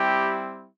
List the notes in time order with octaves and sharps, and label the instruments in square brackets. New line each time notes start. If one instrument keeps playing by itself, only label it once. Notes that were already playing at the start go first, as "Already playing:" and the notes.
Already playing: [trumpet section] G3 C4 E4 G4